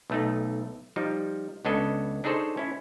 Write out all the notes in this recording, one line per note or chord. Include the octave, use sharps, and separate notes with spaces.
B1 A3 D#4
F3 G3 D#4
C#2 B3 C#4 D4 A4 D#5
D4 D#4 G#4 A4 C5 C#5
C#4 E4